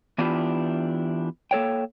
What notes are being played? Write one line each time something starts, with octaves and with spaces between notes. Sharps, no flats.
E3 B3 D4 E4 F4 G4
A#3 A4 C#5 G5